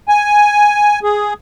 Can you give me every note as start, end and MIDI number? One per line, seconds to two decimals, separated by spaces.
0.08 0.99 80
1.03 1.33 68